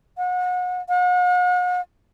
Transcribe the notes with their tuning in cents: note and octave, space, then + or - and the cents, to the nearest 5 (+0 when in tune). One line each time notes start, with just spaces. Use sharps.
F#5 -35
F#5 -45